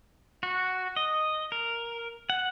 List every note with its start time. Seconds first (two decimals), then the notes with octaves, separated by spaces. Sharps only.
0.43 F#4
0.96 D#5
1.52 A#4
2.30 F#5